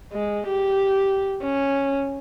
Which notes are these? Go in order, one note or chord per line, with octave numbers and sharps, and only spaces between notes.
G#3
G4
C#4